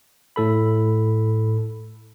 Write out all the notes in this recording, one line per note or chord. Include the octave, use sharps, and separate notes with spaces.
A2 A4 B5